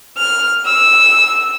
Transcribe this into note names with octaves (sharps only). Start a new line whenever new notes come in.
F6
E6